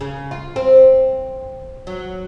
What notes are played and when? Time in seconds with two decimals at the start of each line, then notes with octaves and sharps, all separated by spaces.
0.01 C#3
0.31 F4
0.56 C4
1.87 F#3